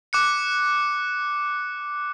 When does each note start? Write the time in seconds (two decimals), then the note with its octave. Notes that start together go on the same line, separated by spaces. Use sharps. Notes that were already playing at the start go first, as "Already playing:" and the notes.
0.13 D6 F#6 C#7